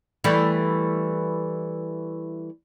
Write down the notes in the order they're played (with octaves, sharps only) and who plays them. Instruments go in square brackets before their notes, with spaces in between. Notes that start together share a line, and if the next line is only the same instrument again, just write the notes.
[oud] E3 G3 A3